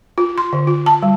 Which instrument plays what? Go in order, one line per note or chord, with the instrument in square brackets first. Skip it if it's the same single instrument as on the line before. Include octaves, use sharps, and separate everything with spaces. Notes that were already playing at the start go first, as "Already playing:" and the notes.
[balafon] F4
C6
D3
F4
A5
G3